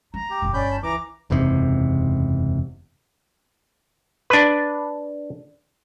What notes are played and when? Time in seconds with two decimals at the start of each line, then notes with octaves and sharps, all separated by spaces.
0.14 A3 A#5
0.30 G4
0.42 F#1 B2
0.54 G1 C#4 D5 B5 G6
0.71 A5
0.83 C#2 E3 A#5 D6
1.30 F#1 E2 G#2 C3
4.30 D4 B4